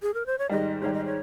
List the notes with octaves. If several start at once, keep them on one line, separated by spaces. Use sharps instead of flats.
G#4
A#4
C5
C#5
G#2 D#3 G3 D#5
G#2 D#3 G3 C#5
D#5
C#5